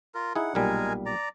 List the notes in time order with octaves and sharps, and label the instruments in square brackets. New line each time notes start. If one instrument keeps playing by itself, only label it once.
[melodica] F4 A#4
[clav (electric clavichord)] D#4 E4 G#4 [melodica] F#5
[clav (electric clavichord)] B1 A#2 G3 [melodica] G#3 A#4 G#5
[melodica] D5 A#5